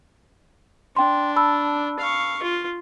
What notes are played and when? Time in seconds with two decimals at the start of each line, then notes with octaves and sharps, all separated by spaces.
0.96 D4 G5 C6
1.36 A5 B5 E6
1.99 F5 C#6
2.42 F4